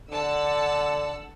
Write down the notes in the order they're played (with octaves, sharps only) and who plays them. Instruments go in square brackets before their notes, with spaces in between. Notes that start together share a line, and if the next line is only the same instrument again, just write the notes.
[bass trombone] D3 [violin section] F#5 A5 E6